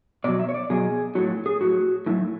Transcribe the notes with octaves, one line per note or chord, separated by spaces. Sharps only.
B2 F#3 D5
E5
C#5
D5
B2 F#3 G#4
A2 F#3 F#4
G#4
A2 F#3 F#4
A2 F#3 E4